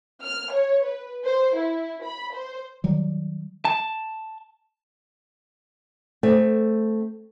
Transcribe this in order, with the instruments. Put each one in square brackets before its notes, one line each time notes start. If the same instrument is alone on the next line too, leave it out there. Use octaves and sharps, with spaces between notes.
[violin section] F6
C#5
B4
C5
E4
B5
C5
[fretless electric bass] D#3 F#3 G3
[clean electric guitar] A5
[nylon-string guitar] A3 C4